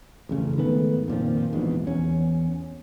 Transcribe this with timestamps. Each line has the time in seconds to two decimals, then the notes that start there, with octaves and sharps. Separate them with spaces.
0.29 A1 F2 C#3
0.57 G#2 D#3 A3 B3
1.08 F2 A#2 D#3 F3
1.53 A#1 E2 G#2 B2
1.87 E2 C#4